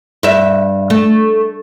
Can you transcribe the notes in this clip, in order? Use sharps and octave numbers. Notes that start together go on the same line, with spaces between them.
G2 E5
A3